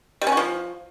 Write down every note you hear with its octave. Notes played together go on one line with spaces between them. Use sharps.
G3
C#4
F#4
F3